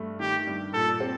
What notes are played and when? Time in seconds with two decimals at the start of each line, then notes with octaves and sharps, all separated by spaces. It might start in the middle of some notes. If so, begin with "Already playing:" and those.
Already playing: G2 A3
0.20 D#3 G4
0.47 G2
0.73 A#2 A4
1.00 C4